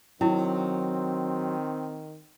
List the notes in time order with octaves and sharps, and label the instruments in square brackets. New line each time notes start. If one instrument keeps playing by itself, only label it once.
[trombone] D#3 [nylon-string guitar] F#3 [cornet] C4 [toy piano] C#4 E4